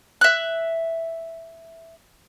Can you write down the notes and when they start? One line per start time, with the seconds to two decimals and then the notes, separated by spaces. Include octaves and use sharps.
0.21 E5 F#6